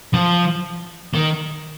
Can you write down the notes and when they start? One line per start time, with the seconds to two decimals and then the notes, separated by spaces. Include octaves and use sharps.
0.14 F3
1.15 D#3